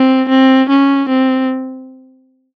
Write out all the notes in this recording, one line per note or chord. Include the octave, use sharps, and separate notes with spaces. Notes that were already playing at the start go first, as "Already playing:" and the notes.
Already playing: C4
C4
C#4
C4